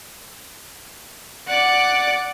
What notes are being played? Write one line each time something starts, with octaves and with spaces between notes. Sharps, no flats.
D5 F#5